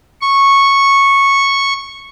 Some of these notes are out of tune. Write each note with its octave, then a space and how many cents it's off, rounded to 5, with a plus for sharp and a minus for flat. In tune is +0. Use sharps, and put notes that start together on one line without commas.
C#6 -10